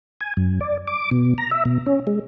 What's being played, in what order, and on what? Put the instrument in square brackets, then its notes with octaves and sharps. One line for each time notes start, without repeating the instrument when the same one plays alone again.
[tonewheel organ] G#5
F#2
D5
D6
B2
A#5
E5
B2
C#4
G#3